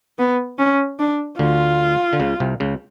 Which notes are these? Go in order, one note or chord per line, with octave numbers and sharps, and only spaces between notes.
B3
C#4
D4
D2 D3 F4
D3
C#2 C#3
C2 C3
C#2 C#3